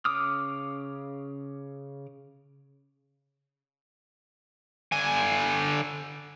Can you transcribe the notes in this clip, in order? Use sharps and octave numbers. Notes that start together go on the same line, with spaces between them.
C#3 D6 D#6 F6
D3 G#5